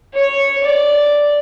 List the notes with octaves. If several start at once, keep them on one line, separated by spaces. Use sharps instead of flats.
C#5
D5